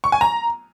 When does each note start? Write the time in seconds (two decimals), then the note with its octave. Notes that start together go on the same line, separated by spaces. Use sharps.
0.04 C#6
0.12 G#5
0.21 A#5